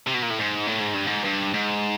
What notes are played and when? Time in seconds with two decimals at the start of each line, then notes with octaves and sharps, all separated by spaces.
0.07 C3
0.14 B2
0.22 A#2
0.30 A2
0.39 G#2
0.67 A2
0.81 G#2
0.94 G2
1.07 G#2
1.24 G2
1.54 G#2